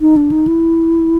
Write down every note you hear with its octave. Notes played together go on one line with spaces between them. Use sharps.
D#4
D4
D#4
E4